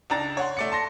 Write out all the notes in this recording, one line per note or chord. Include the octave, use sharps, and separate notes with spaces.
C#2 D4 A#5 A6
C#5 F#5 C6
A3 D5 C#7
A5 C6 A#6